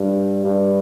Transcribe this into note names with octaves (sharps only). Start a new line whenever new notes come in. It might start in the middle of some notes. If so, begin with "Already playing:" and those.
Already playing: G2
G2